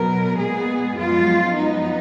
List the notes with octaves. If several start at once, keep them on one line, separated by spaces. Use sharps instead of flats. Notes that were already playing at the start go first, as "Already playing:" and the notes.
Already playing: B2 F#3 B3 A#4
A#2 G#3 B3 G#4
F#2 F3 G#3 B3 F4
F#2 F3 B3 D#4